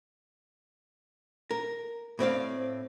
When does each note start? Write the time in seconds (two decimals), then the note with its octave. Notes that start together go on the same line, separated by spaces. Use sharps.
1.51 A#4
2.19 A2 C4 D5 F5